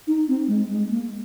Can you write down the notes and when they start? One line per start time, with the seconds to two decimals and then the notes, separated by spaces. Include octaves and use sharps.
0.07 D#4
0.28 C4
0.48 G#3
0.70 G#3
0.90 A#3